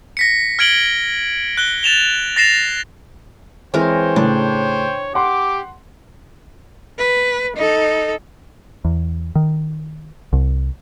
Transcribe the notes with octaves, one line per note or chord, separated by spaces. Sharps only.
A#6 B6 C#7
F6 G#6 D7 F#7 G7
F#6 G7
A6 E7 F7 G7
A6 A#6 C7 E7 F7
E3 G#3 C4 A#4 C5 C#5 G5
A2 C#3 D4
G4 F#5 C6 D6
B4
D#4 A4
E2
D#3
C2